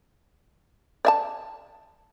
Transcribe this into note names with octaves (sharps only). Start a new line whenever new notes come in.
D5 E5 A5